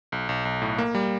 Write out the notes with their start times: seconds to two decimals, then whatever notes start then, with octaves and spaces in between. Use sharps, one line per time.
0.12 B1
0.29 B1
0.45 B1
0.62 A2
0.78 A#3
0.95 G3